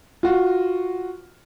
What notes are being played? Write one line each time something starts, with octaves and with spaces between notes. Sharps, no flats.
F4 F#4